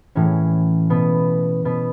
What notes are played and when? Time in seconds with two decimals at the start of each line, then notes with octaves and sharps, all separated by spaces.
0.15 A2 E3 C#4
0.90 B2 B3
1.65 B2 B3